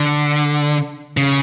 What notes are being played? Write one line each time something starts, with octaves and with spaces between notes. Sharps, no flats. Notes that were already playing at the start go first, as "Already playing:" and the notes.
Already playing: D3
C#3